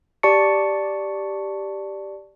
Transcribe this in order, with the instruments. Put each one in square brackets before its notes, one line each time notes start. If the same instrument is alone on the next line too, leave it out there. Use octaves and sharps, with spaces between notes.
[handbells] G4 D5 A5 C#6 C#7